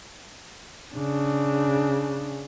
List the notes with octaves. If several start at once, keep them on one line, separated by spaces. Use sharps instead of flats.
C#3 D4